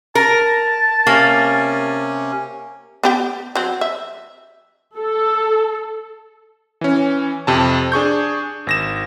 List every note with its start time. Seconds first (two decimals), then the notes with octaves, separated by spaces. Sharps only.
0.15 A#4 A5
1.07 C3 A#3 C#4
3.03 B3 G4 G5
3.55 F#3 C4
3.81 E5
4.97 A4
6.81 E3 C#4
7.47 F2 C3 A5
7.92 D4 G#4 C#6 G6
8.67 G#1 A#6 E7